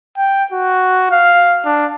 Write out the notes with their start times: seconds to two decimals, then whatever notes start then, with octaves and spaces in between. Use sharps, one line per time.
0.18 G5
0.52 F#4
1.11 F5
1.65 D4